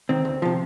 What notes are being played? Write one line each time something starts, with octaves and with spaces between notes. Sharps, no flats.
D#3 C4
D2
C3 F3